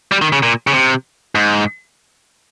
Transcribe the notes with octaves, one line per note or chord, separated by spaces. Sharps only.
G3
D#3
C#3
A#2
C#3
C3
G#2